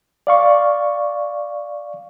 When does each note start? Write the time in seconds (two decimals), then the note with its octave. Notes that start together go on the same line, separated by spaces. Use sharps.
0.27 D5 F5 C#6